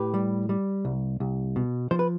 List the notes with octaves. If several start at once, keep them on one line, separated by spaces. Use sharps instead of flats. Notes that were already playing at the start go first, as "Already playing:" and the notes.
Already playing: A2 G4 B4
G3
G3
C2
C2
B2
F3 C5
B4